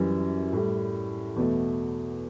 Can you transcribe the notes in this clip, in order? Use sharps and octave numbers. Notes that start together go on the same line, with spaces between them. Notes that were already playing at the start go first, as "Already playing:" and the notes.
Already playing: F#2 E3 G3
A2 G3
E2 B2 A3